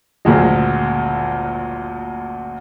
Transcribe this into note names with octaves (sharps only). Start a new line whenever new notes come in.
F#1 D2 A#2 G#3